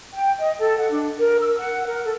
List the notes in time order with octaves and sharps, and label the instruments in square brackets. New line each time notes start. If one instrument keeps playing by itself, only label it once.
[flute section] G5
D#5
A4
F#5
D4
A#4
E6
F#5
A#4
A4